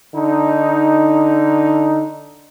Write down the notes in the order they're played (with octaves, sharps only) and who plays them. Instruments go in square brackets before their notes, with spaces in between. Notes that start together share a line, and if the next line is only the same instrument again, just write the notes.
[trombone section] D3 D#4